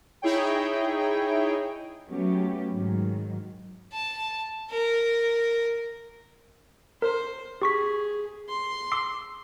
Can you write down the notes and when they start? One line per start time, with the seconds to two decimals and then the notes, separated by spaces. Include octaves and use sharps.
0.22 D#4 E4 G#4 C#5 G5
2.09 F#3 A3 B3 C#4 G4
2.72 G#2 D#3 F#3
3.92 A5
4.70 A#4
7.02 A#4 C5
7.62 G4 G#4 C#6 B6
8.48 C6
8.92 D6 E6 C7